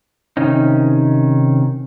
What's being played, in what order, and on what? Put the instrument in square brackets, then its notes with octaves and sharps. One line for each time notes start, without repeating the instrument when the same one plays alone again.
[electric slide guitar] C3 D#3 C#4 D#4